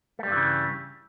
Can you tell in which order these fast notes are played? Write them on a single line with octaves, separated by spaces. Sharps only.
A3 G3 G2 E3 C#3